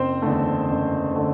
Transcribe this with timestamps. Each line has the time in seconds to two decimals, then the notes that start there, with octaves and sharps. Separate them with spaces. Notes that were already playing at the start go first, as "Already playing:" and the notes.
Already playing: F#1 C4 C5
0.22 E2 D3 A3
0.69 F#1
1.16 D3 A3